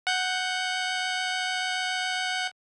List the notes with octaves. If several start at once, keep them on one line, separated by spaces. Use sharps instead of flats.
F#5 G6